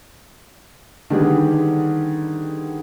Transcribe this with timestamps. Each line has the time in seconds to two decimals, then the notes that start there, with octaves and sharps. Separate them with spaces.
1.10 D3 D#3 G3 B3 G4 G#4